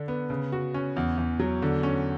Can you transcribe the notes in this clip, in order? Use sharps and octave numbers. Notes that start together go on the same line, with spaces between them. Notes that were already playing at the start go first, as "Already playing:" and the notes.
Already playing: D3 D4
B3
C#3
F#4
C#4
E2
E2
F#3
D3
C#4